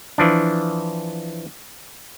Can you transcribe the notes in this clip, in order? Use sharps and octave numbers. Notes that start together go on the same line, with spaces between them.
E3 F3 D4